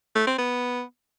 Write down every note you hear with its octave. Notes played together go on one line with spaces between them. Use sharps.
A3
C4
B3